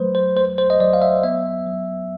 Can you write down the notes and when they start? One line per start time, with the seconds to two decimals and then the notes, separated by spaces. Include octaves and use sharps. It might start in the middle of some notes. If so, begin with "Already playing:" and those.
Already playing: F#3 A3 B4 C5
0.15 C5
0.36 A3 C5
0.58 C5
0.70 D#5
0.80 F#3 D5
0.93 F5
1.02 E5
1.23 B3 E5
1.67 F#3